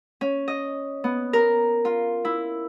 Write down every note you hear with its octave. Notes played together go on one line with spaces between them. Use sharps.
C#4
D#5
B3
A#4
F4
E4